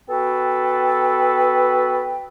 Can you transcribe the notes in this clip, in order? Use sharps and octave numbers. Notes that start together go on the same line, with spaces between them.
B3 F#4 A4 B4 G5